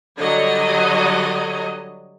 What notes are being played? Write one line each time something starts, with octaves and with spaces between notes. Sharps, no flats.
D3 F#3 G3 C#5 D#5